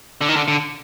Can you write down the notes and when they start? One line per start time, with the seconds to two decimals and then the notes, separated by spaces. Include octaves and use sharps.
0.21 D3
0.29 D#3
0.36 D3
0.48 D3